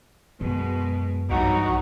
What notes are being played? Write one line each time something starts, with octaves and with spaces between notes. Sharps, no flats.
F#2 B2 G#3
B1 G2 E3 F#3 D#4 F#4